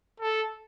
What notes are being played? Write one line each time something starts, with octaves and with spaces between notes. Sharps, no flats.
A4